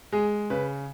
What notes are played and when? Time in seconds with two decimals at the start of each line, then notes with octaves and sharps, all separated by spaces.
0.12 G#3 G#4
0.50 C#3 B4